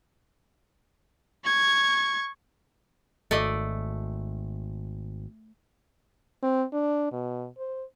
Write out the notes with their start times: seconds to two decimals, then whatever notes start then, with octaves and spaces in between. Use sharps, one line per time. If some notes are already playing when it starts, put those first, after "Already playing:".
1.44 C#6 G#6
3.31 G#1 A3 D5 D#5
6.43 C4
6.73 D4
7.12 B2
7.57 C5